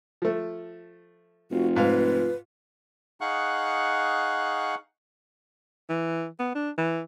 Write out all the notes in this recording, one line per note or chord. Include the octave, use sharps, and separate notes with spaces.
F3 A3
F1 F4 F#4
G#2 B4 F5
D#4 G#4 F5 F#5 C#6 F#6
E3
B3
D4
E3